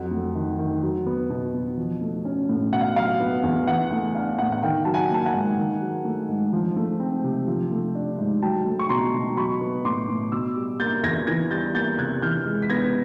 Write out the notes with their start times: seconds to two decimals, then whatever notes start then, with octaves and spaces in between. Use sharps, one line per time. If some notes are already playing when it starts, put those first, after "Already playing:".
Already playing: F2 F#3 F#5
0.11 A3
0.35 D#3
0.59 D#3
0.83 F#3
1.06 B3
1.30 B2
1.54 B2
1.77 F3
2.01 A3
2.25 C#4
2.49 A2
2.73 B2 F#5
2.81 F5
2.96 F#3 F5
3.20 B3
3.43 E2
3.67 E3 F#5
3.91 A3 F#5
4.15 D4 F5
4.39 A2 F#5
4.52 F#5
4.63 D#3 F5 G5
4.85 F#3 A5
4.94 F#5 G#5
5.10 A#3 A5
5.26 F#5 G#5
5.34 G#2
5.57 D#3
5.81 F#3
6.05 A3
6.29 G#2
6.53 F3
6.76 A3
7.00 C4
7.24 C3
7.48 F3
7.71 A3
7.95 D4
8.18 G#2
8.42 F#3 G5 A5
8.66 A3
8.79 C#6
8.89 B2 A#5 C6
9.14 B2
9.37 F#3 B5 C#6
9.61 B3
9.85 A2 C6 D6
10.09 A2
10.32 B2 D6 E6
10.56 G3
10.80 A#3 G6 A6
11.03 E2 G#6 A#6
11.27 E3 G#6 A#6
11.51 G3 G6 A6
11.74 A#3 G6 A6
11.98 C3 F#6 G#6
12.22 E3 F6 G6
12.46 G#3
12.62 B6
12.70 B3 G#6 A#6